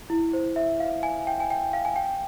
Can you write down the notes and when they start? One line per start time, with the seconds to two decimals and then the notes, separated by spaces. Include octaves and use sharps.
0.10 E4
0.33 C5
0.56 E5
0.80 F5
1.03 G#5
1.27 G5
1.40 G#5
1.50 G5
1.73 F5
1.85 G#5
1.96 G5